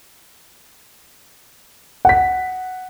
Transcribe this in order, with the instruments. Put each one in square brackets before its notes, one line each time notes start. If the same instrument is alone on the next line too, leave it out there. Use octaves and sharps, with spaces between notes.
[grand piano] F#5 B6